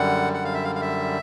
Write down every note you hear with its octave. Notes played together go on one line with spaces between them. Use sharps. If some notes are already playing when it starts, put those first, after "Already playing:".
Already playing: F#2 D3 G3 F#5
F#5
F5
E5
F5
F5
E5